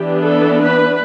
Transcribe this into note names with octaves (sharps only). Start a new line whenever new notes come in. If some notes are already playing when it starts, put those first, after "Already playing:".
Already playing: E3 B3 D4 G4
A4
B4